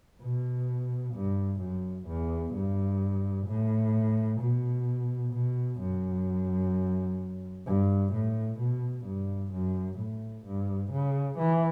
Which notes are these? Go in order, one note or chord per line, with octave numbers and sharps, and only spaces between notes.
B2
G2
F#2
E2
G2
A2
B2
B2
F#2
G2
A2
B2
G2
F#2
A2
G2
C#3
E3